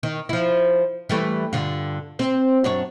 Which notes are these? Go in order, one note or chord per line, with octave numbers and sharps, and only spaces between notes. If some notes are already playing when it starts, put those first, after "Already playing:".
D#3
F3 E4
E3 G3 A3
G2 D3 F4
C4 C5
F#2 D4 C#5